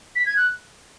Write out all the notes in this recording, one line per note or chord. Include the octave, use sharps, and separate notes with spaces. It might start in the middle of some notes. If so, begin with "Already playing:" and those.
B6
G#6
F#6